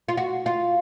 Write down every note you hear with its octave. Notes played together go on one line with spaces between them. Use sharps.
F4
F#4
F4